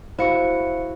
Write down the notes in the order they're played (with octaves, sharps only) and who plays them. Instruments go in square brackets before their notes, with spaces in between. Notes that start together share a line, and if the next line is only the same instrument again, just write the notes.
[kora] E4 F#4 [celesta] C5 F5 C#7